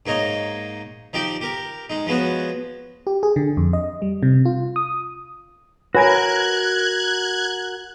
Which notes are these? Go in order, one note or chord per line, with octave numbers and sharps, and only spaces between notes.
G#2 A#3 D#4 C#5 D#5
F3 D#4 G4 D5 G5
G4 A#4
G#3 D#4
F3 G#3 B3 F#4 C#5
G4
G#4
D3
F2
D#5
G3
C3
F4
D#6
F#4 A#4 B4 C#5 G#5 F#6 G#6